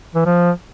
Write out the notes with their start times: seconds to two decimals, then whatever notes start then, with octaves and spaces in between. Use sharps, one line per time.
0.15 E3
0.26 F3